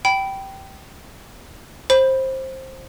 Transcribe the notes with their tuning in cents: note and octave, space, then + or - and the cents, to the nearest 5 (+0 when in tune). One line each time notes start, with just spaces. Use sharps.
G5 -15 B5 +0
C5 +15 B5 +0